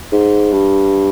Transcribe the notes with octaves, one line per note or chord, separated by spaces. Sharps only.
G#2
G2